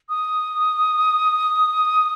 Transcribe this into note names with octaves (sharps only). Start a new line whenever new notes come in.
D#6